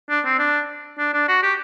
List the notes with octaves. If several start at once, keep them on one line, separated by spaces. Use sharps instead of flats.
D4
C4
D4
D4
D4
F#4
G4